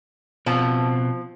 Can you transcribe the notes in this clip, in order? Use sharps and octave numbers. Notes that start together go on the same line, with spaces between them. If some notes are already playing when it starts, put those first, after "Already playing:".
B2 F3 C4 A5